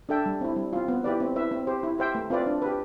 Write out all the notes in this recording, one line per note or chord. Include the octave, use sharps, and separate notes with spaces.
D4 A4 E5 G5
G3
C4 E4
G3
C4 F4
B3
E4 G4 B4 D5
C4
E4 B4 E5
C4
G4 C5
E4
G4 C5 E5 G5
A3
C4 F4 B4 D5
D4
G4 B4